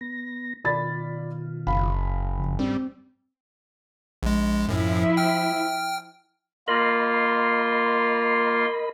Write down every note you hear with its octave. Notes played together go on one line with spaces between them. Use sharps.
B3 A#6
B2 D#3 F4 D5 B5 A6
F#1 F5 B5
F2 C#3 F3
G#2 G3 C4 C#4
A#1 G#3
F#2 A2 F3 E4
G5 F6
A#3 F4 A#4 D#5 B5 C6